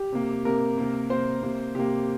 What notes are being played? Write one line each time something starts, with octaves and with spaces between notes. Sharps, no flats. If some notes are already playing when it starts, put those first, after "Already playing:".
Already playing: G4
C3 A#3
C3 A#3 A#4
C3 A#3
C3 A#3 C5
C3 A#3
C3 A#3 G4